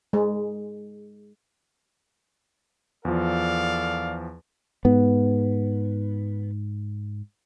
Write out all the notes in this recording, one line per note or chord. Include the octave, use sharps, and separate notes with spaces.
G#3
E2 F3 A4 D5 F5
G#2 B3